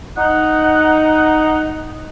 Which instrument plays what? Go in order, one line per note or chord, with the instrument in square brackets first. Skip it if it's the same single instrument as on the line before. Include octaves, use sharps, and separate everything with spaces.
[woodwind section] D#4 F#5